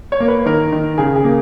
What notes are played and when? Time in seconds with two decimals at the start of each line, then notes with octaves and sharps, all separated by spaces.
0.12 C#5
0.20 A#3
0.28 B4
0.46 D#3 A#4
0.72 D#3
0.98 C#3 G#4
1.16 G#4
1.24 A#3